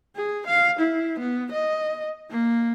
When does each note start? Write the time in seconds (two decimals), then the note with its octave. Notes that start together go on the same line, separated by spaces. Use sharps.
0.16 G#4
0.47 F5
0.80 E4
1.20 B3
1.52 D#5
2.30 A#3